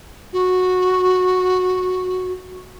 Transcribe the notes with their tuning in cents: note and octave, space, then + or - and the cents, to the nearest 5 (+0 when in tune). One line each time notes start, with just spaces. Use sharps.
F#4 -10